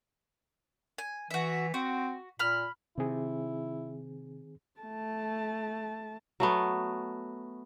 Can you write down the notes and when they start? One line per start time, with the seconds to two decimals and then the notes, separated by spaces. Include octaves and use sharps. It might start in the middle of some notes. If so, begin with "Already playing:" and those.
0.98 G#5
1.31 E3 F#4 E5
1.74 C4 F#4
2.39 A#2 B5 F6
2.98 C3 D#3 C4 E4 G#4
4.80 A3 A5
6.40 F#3 A3 B3